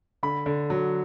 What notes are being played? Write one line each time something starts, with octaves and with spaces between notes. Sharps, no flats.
D3 B5
D3
F#3